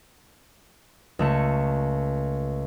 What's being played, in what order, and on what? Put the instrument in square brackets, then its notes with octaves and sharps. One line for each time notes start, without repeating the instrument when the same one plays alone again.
[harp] C#2 A3 C#7